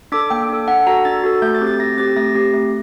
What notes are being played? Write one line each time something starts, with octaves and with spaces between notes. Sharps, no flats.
D4 A4 D6
A#3 G5
D4 A4
D4 F#5
F#4 A4 A#5
D4 A6
F#4 A4
A3 G6
A6
C4 G4
A6
A3 A#6
C4 G4 A6
A3 A#6
C4 G4
A3